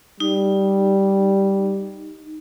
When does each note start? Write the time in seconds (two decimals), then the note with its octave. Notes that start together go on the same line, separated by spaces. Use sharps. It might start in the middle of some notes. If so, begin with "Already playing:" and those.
0.20 G3 D#4